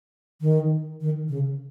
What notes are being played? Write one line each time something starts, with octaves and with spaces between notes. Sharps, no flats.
D#3
D#3
C#3